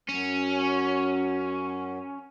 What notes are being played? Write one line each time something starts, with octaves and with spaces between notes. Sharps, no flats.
F#2 F#3 C#4